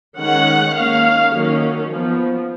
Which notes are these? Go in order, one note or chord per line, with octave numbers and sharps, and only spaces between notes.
D#3 G#3 C#4 F#5
D#3 A#3 C#4 F5
D#3 F#3 A#3 C#4
F3 B3